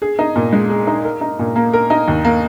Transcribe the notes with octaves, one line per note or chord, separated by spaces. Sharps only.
G#4
D#4
A#2
G#3
G#4
D#4
A#4
D#4
A#2
A#3
A#4
D#4
D#2
A#3